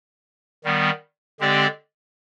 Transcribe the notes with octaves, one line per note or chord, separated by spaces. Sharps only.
D#3 G3 B3
D3 G#3 C4 G4 D5